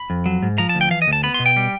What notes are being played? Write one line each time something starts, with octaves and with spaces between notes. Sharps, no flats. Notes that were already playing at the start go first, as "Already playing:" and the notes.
Already playing: B5
F2
F#3
G#2
F3 A#5
A5
D2
G5
E3 F5
D#5
D2
A5
B3 B5
C6
B2
G5
G3